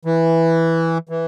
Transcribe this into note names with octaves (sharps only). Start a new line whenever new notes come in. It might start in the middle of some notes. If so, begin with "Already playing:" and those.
E3
E3